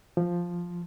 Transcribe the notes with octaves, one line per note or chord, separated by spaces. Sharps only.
F3